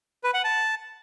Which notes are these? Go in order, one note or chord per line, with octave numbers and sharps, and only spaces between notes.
B4
F#5
A5